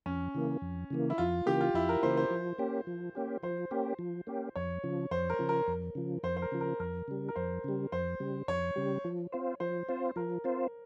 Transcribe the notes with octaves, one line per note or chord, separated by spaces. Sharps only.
F2 C#4
C#3 E3 A#3
F2
C#3 E3 A#3
E4
F2 F4
C#3 E3 A#3 G4
F4
F2 E4
A#4
C#3 E3 A#3 C5
C5
F3
A#3 C#4 G4
F3
A#3 C#4 G4
F3 C5
A#3 C#4 G4
F3
A#3 C#4 G4
F2 C#5
C#3 F3
F2 C5
A#4
C#3 F3
A#4
F2
C#3 F3
F2 C5
C5
A#4
C#3 F3
A#4
F2 A#4
C#3 G3
A#4
F2 C5
C#3 G3
F2 C5
C#3 G3
F2 C#5
C#3 G3
F3
C4 F4 C5
F3 C5
C4 F4 C5
F3 A#4
C4 F4 C5